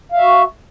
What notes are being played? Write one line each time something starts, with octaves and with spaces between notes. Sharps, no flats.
F#4 E5 F5